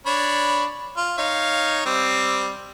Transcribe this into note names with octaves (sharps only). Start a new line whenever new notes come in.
D4 C#5 B5
F4
D#4 C#5 F5
G3 C4